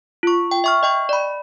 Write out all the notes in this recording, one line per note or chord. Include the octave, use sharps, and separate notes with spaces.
F4 C#6
G5
E5 C#6 F6
D#5 G5 C#6
D5 B5